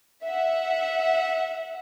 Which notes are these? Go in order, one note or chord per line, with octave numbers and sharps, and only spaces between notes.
E5 F#5